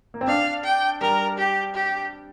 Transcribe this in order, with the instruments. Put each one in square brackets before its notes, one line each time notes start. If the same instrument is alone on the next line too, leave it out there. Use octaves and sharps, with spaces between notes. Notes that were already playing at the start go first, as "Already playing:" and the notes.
[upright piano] A#3
C4
[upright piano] D4 [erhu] F5
[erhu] G5
[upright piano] G3 [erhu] A#4
[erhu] G4
G4